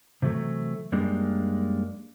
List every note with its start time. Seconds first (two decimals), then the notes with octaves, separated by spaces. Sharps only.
0.22 C3 E3 F#3 A3
0.92 F#2 G3 G#3 A#3 D4